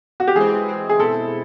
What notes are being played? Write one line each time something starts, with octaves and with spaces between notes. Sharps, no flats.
F#4
G4
E3 G#3 C4 G#4
E3 G#3 C4
G#4
B2 G#3 C4 E4 A4